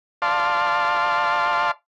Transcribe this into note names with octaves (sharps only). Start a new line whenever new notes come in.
D5 F5 A5 C6